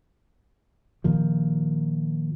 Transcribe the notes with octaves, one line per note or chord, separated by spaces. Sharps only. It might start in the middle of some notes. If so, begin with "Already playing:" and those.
A#2 D#3 F3